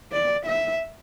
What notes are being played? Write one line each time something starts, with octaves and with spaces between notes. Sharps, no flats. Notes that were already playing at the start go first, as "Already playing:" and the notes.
D5
E5